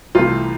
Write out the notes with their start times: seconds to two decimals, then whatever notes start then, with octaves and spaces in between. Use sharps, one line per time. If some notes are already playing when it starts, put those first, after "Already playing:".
0.15 C2 C3 E3 A3 F4